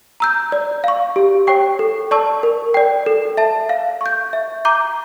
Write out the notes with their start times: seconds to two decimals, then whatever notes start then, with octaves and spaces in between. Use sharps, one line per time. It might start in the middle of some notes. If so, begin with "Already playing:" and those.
0.20 A#5 E6 G6
0.52 D5
0.84 F5 C#6
1.16 G4
1.47 C#5 G5 C#6
1.79 A4
2.11 D5 A5 C#6 E6
2.43 A#4
2.74 D5 G5
3.06 A4
3.37 E5 A5
3.69 F5
4.01 C#6 G6
4.33 E5
4.65 A#5 D6 G6